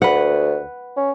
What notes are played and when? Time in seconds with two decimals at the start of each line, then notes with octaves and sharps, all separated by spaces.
0.02 D2 B4 F#5
0.97 C#4